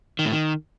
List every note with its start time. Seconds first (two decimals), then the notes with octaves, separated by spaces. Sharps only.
0.19 D#3
0.26 A2
0.32 D#3